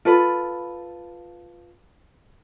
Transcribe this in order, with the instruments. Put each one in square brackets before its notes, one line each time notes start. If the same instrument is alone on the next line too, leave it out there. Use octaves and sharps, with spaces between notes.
[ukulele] F4 A4 B4 B5